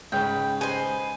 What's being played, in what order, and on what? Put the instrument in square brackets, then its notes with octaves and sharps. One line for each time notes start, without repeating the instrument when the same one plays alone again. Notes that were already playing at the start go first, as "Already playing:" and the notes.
[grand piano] G#2 C#3 [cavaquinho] B4 C#5 G5
[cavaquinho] B4 D#5 [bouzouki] C5 G#5